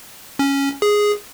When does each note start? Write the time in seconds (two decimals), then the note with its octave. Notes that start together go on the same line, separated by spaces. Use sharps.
0.39 C#4
0.82 G#4